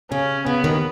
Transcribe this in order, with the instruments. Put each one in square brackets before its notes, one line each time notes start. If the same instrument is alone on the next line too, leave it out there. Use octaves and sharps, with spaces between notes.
[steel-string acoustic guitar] C#3 [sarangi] C#4
[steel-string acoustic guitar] C#3 [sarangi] B3
[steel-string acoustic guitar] D#2 D#3